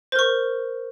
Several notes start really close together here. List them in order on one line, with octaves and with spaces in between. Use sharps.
C5 A#4 C#6